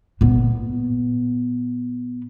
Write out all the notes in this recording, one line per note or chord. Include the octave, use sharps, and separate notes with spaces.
A#2 B3